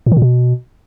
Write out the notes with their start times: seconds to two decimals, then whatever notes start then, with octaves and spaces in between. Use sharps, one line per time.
0.06 A2
0.12 D#3
0.17 A#2
0.22 B2